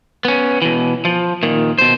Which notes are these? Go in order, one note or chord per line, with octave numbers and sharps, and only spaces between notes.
B3 C#4
B2 E3
F3
A#2 D#3
B2 C5